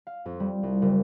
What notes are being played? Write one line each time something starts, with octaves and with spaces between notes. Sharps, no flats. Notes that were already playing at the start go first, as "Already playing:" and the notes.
F5
F2
G3
C2
F#1